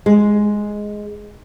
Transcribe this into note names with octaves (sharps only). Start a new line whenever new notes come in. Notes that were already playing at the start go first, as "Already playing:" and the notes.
G#3